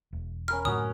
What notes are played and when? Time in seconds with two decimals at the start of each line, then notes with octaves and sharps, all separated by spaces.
0.13 E1
0.48 C#4 A#4 B5 F6
0.65 F#2 A2 D3 C#4 F#4 D#6